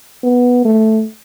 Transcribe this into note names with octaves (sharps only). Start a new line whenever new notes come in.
B3
A3